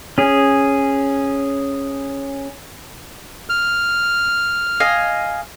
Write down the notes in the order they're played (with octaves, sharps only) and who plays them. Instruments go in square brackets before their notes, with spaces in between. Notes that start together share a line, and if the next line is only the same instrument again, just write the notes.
[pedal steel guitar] C#4 G#4
[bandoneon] F6
[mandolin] D#5 F5 G#5